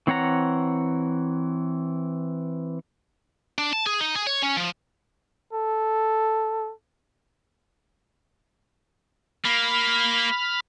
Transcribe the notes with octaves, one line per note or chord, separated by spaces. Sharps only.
E3 C4 C#5 F#5 A#5
D4
A5
G#4
D#4
G#4
C#5
C#4
F3
A4
A#3 B5 F6